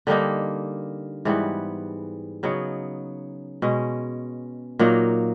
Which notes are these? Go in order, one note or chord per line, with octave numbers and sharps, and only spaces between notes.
D3 G3 A#3 D#4
G#2 E3 G3 B3
C#3 F#3 B3 D#4
B2 G#3 C#4
A#2 F#3 A#3 D#4